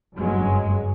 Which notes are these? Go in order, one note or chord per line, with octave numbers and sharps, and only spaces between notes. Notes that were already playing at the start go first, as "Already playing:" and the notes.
F#1 G2 F#3 G#3